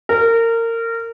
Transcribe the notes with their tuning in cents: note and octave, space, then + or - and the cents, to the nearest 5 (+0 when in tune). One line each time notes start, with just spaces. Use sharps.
A#4 -25